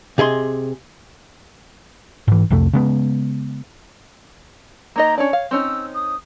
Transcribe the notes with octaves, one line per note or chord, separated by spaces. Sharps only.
C3 G#4 D#5 C6
G#2 E3
C2 F2 C3 A3
C#3 G#3 B3
A#3 D#4 D#5 A#5
C#4 D4 C#5
F5
C4 C#4 D#4 E6
D#6